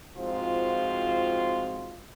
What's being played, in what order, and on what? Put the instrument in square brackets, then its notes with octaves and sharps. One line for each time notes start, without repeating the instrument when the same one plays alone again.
[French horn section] G#2 F3 C4 F4 F#4